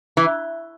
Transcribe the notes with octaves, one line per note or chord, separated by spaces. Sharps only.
E3